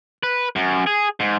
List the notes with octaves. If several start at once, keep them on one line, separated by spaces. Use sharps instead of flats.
B4
F#2
G#4
G#2